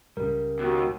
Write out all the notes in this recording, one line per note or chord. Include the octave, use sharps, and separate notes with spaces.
C#2 C#3 G3 A#4
D#2 F#4